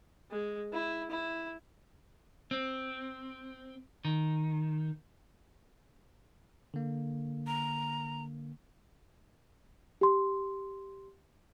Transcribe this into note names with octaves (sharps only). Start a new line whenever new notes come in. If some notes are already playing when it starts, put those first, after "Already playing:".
G#3
E4
E4
C4
D#3
D3 A#3
A#5
G4 C6